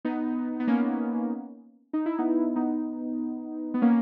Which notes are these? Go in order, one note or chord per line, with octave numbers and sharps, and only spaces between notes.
B3 D#4
B3
A#3 C#4
D#4
E4
B3 D#4
B3 D#4
B3
A#3 C#4